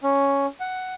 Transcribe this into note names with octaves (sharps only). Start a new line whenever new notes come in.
C#4
F#5